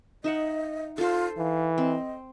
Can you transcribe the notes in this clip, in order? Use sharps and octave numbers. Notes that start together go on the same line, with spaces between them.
D#4 D#5 E5 F#5
F4 A4 C5
E3 F5
C4 D#5